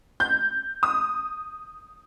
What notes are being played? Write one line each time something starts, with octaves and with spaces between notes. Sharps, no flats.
G6
D#6